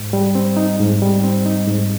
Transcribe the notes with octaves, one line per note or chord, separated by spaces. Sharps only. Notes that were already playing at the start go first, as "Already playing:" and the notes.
Already playing: G#2
G3
C4
D#4
G#2
G3
C4
D#4
G#2